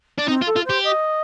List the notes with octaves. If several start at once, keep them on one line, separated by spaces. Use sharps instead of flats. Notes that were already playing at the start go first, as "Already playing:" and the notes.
D4
C4 D#4
F4
A4
F4
G4 C5
D#5